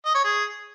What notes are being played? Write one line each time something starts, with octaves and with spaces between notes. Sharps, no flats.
D#5
C#5
G#4